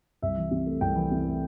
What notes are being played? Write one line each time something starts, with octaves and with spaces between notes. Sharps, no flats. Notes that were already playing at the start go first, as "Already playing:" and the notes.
C2 E5
E3
C3
A3
C2 G5
E3
C3
A3